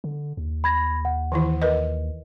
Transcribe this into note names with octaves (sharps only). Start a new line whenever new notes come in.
D3
D#2
B5 G#6 A#6
F#5
D#3 E3 E4
A#4 B4 D#5